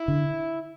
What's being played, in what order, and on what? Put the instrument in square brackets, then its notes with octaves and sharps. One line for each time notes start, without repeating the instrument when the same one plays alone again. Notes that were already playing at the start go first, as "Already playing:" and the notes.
Already playing: [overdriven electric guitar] E4
[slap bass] D3